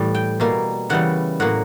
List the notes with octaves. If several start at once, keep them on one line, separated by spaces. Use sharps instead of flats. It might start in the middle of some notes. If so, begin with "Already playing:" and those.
Already playing: A2 E3 G3
G5
B2 G3 A#3
C#3 E3 G3 B3 F#5
A2 F#3 A#3 F#5